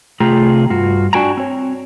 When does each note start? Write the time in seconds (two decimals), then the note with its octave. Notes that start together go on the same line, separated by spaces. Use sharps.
0.20 C3 A3 F4 G#4 G5 A#5
0.70 G2 F4 F#4
1.13 D4 F#4 G5 G#5 A#5
1.37 C4 C#5